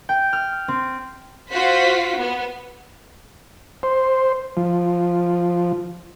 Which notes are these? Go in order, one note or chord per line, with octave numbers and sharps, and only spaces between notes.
G5
F6
C4
F4 F#4 C5 F#5 B6
B3
C5
F3